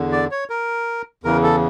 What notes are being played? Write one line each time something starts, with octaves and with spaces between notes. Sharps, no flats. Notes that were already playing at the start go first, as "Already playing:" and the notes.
Already playing: E2 D3
D5
C#5
A#4
E2 C#3 E3 A#4
A4